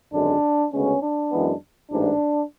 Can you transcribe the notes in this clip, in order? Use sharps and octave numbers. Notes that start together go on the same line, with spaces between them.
G#1 F#2 D3 G#3 D4
D2 C#3 G#3 B3 C#4
D4
F#2 E3 G#3 B3
A1 G#2 E3 D4